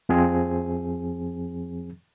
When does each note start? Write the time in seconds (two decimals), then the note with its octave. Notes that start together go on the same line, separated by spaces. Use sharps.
0.09 F2 F3 C4 G#4